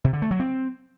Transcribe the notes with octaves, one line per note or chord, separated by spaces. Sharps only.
C3
D3
A3
F#3
C4